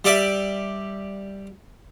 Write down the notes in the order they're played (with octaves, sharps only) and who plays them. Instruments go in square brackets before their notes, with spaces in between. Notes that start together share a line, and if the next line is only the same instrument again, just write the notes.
[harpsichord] G3 G4 D5 E5